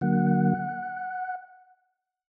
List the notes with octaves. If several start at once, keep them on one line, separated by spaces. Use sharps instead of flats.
D3 F#3 A#3 F#5